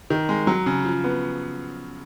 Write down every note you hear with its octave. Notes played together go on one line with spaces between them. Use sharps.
D#3
G#3
F#3
C#3
F3
B3